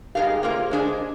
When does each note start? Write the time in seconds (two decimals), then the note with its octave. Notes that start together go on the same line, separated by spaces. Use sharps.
0.15 G#3 D#4 G4 A#4 F5
0.29 G#4
0.43 A#3 F4 A#4 C5
0.71 G#3 D4 G#4 C5
0.86 D#5